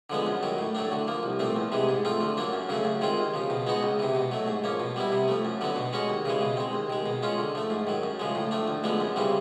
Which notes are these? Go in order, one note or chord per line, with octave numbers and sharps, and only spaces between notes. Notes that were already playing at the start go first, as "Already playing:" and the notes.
D3 F3 G#3 B3
F#2
D#3 F#3
A2
F#3 A3 D4
D3
F3 A#3
C2
A#2 F3 A3 C4
E2
C3 E3 G#3
G#2
F3 A3 C4 F4
D3
F#3 A#3 D4
F#2
C#3 F#3 A3
F#2
D#3 G#3 C4 F4
D#2
C#3 F3
B2
G#3 B3 D#4 F#4
C#2
C3 E3
B2
F#3 A3
G#2
F3 A#3 C#4
B2
G3 B3 E4
C3
F3 A3
F#2
D3 F#3 B3
B2
G#3 C#4 F#4
D#2
C#3 E3 G#3
B2
G#3 C4
D#2
D#3 G#3
B2
G#3 C#4 F4
D3
F3 A3
G#2
D#3 F#3
F#2
C#3 F3 G#3
A2
F3 A3 D4
D2
D3 F3 G#3 B3
F#2
C#3 E3 G3 C4